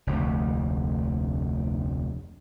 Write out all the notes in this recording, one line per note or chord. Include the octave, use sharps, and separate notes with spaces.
F1 D2 D3